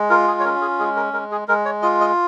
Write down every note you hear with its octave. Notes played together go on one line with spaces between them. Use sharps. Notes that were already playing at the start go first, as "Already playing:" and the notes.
Already playing: G#3
F4 A#4
G#4
C#5
C#4 A#4
G#4
G#3 G#4
A#4
G#3 A#4
G#4
G#3 A#4
C#5
F4 D#5
D#5